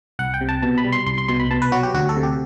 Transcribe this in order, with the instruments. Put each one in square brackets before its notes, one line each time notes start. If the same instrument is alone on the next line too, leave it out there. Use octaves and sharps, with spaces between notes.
[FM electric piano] C2 F#5
G5
C3
A5
B2 A5
B5
G3
C6
C2 C6
C6
B2 C6
B5
B2 A5
B4
F#3 F#4
G4
D2 F#4
A4
C3
G4